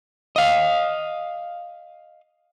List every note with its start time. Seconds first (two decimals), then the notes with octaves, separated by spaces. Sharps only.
0.36 D#5 F5